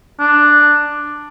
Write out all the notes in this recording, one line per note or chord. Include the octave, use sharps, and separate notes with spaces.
D4